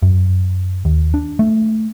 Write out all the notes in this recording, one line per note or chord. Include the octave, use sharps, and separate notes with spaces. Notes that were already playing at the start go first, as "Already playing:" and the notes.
F#2
D#2
D4
A3